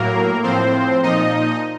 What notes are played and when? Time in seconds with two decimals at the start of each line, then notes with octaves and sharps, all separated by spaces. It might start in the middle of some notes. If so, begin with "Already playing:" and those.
Already playing: A2 F#3 A#3 A#4
0.43 A2 F3 C4 C5
1.03 A#2 F3 D#4 D#5